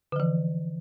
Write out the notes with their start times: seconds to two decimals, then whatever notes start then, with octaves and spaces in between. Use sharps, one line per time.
0.12 D3
0.16 F3
0.20 E3